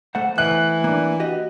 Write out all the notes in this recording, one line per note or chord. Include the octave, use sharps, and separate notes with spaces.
A3 C5 F#5
E3 F#6
A#3 D4
F#4 G4 D#5